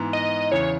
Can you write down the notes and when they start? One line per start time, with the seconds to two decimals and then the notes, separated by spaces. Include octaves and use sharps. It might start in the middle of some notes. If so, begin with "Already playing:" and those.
Already playing: G#2 E3 B3
0.13 D#5
0.51 E2 C#3 E3 C#5